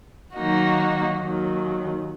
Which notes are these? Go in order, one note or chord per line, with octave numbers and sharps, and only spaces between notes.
D#3 F#3 A#3 D#4 F#4
D#2 D#3 F#3